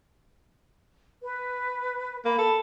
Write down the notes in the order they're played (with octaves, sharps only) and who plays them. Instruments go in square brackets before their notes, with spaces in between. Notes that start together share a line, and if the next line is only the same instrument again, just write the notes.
[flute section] B4
[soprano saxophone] A#3 [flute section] B5
[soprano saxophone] A4